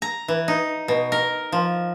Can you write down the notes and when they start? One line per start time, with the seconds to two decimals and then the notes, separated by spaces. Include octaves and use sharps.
0.02 A#5
0.28 E3
0.48 D#4
0.88 B2
1.12 A#4
1.52 F3